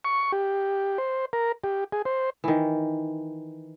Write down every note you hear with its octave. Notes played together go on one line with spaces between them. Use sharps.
C#6
G4
C5
A#4
G4
G#4
C5
D#3 E3